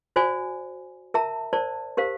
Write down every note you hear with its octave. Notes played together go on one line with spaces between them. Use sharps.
F#4 C5 D5 G#5
A#4 E5 A5 A#5
A#4 C5 D5 A5
G4 A#4 C5 F5